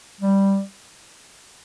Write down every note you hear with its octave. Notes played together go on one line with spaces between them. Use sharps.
G3